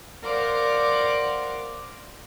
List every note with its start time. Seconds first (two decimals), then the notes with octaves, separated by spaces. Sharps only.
0.24 A#4 C5 D5 F5 F#5 D6